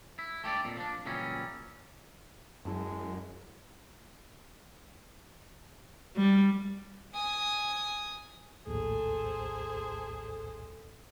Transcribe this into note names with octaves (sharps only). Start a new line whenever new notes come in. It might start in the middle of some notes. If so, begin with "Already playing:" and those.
E4
A3 G4 C#5 D5
F2 A#2
F3 D4
A#2 C#3 E3 F#3 G3 C#4
F#2 G#3 E4 A5
G3
G#5 D#6
A#1 D#2 A2 G#4 A4 C5